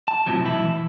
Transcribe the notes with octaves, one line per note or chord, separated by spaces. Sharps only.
A5
F#2 A2 C3 F3 F#3
B1 E3 E4 A5
E3